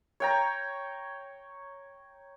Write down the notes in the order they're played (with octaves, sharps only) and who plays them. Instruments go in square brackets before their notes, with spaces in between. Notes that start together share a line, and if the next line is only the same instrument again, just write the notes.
[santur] C#5 G5 A#5